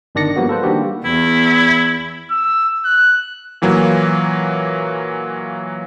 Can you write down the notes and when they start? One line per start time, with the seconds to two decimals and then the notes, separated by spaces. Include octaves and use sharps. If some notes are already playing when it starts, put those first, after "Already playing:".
0.15 G1 D#3 D4 D5 A#6 C#7
0.36 F3 G3 A#3 B3 F#4
0.49 A4 B4 C5
0.63 D#3 G3 A#3 D4 F#4 G4
1.05 E2 E4
2.31 E6
2.85 F#6
3.62 A#2 E3 F#3 A#3